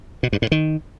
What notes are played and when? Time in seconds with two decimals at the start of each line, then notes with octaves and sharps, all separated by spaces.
0.23 B2
0.33 G2
0.42 A2
0.52 D#3